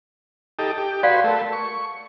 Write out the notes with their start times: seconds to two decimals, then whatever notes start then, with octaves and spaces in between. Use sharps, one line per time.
0.59 D#4 G4 A4
0.78 G4
1.03 F#4 B4 D5 F5 C6
1.24 A3 A#4 A5
1.53 C#6